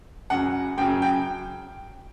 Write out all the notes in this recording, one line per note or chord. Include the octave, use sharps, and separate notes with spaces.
F#2 C#3 F#3 F#5
F#2 C#3 F#3 G5
G5